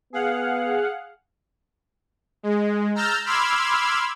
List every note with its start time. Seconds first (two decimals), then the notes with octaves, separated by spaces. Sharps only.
0.13 B3 G#4 F5 F#5
2.43 G#3
2.95 A#5 E6 F6 G6 A6
3.25 B5 C6 D6 E6 F6 G#6